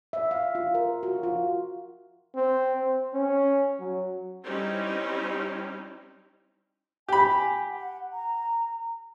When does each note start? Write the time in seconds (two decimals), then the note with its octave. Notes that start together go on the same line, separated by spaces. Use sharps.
0.13 E5
0.31 F5
0.55 F4
0.74 A#4
1.03 F#4
1.23 F4
2.35 C4
2.81 C4
3.13 C#4
3.79 F#3
4.45 G3 C4 C#4 D#4 E4 G4
7.08 G4 G#5 B5
7.70 F#5
8.13 A#5